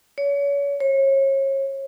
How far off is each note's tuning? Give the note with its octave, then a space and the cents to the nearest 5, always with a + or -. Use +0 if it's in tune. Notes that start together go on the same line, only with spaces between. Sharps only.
C#5 +35
C#5 -35